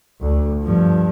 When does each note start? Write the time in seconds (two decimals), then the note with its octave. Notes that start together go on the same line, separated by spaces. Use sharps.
0.21 D2
0.63 G2 F3